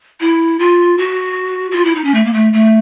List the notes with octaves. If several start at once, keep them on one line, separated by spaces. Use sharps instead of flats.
E4
F4
F#4
F#4
F4
E4
D#4
C#4
A3
A#3
A3
A3